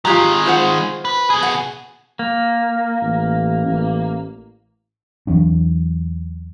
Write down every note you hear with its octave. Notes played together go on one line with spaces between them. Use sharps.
D#3 G#3 F4 G4 A#5
F4 C5 F#5
B4
B2 G#4
F#5
A#3
A1
A1
E2 E3 F#3 D4